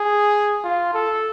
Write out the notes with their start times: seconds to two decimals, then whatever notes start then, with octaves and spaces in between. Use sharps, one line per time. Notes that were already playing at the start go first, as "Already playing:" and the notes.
Already playing: G#4
0.64 F4
0.94 A4